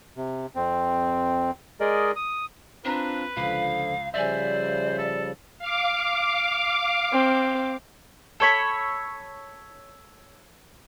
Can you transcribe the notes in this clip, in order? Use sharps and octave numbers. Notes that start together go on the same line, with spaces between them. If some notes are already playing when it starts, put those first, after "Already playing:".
C3
F2 C4
G#3 G#4 A#4 D5 D#5
D#6
C4 D4 F4 B4 A#5
C#2 D3 F3 F5 B5
C#3 F3 G3 C5 D5 E5 G#5
A4
F5 D6
C4
A4 C#5 B5